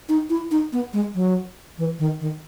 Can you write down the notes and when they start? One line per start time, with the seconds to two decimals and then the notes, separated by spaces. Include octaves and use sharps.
0.09 D#4
0.30 E4
0.51 D#4
0.73 B3
0.93 G#3
1.15 F#3
1.78 E3
1.99 D#3
2.20 D#3